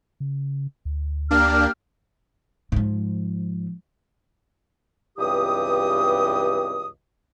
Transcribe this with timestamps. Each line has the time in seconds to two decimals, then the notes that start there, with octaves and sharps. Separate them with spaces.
0.20 C#3
0.85 D2
1.31 A#3 D4 G4 F6
2.72 G#2 F3
5.17 C#2 G2 E3 C4 G4 D#6